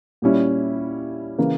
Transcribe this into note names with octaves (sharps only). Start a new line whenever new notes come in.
A#2 G3 C#4 E4
C#3 E3 A#3